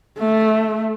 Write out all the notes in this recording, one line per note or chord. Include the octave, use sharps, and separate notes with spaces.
A3